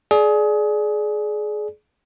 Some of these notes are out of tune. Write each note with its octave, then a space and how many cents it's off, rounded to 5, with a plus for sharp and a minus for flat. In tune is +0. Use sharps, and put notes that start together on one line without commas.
G#4 +25 D5 +0